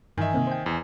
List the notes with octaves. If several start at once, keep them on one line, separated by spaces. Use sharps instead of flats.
G2 D#3 E3 D#5 E5 G#5
C3 A#3 C4
C5 G5
E2